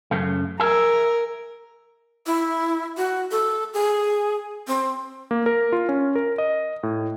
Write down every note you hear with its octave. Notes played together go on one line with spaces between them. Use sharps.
F#2 C#3 A3
G#4 A#4 E5
E4
F#4
A4
G#4
C4
A#3
A#4
F4
C#4
A#4
D#5
A2